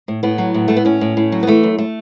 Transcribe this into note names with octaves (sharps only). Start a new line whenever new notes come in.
A2
A2 B3
F#3
A2
A2 A3
B3
A2 C#4
A2
A2
F#3
B3
E3 A3
F#2
A3